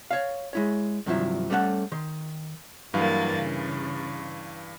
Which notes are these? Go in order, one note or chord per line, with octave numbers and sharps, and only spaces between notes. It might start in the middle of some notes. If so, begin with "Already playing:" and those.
C#5 F5
G#3 E4 C#5
G2 C3 D#3 F3 F#3 E4
G3 A3 C#4 E4 A4 F#5
D#3 C6
G2 E3 F#3 A#3 F5 A6
C#3